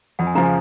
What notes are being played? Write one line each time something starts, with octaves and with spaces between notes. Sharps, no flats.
F2 F#5
G#5
C#3 F3 A#5
G#5